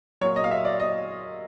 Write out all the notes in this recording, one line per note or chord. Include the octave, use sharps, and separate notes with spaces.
A#2 F#3 C#5
D#5
F5
E5
D5
D#5